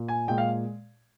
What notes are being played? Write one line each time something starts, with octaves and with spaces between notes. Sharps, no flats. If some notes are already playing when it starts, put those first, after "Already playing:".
Already playing: A#2
G#5
A#2 G#3 G5
F5